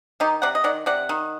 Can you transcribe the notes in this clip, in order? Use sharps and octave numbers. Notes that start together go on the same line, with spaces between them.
D#3 D#4 G4
C3 D5 F#5
D#5
D#3 D5 F#5
C3 D5 F#5
D#3